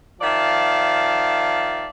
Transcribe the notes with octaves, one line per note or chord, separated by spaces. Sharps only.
D#3 F3 D5 E5 F5 A5